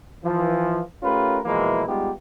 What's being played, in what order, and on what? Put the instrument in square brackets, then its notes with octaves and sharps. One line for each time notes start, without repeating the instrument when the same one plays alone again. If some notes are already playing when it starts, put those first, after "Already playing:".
[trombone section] E3 F3
A3 C#4 F4 G4 A#4 B4
B2 E3 F3 G#3 A#3 E4
G3 G#3 B3 D#4 F4 G4